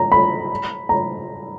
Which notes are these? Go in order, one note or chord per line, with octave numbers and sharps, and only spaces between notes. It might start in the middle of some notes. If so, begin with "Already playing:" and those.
Already playing: A#5
B5
A#5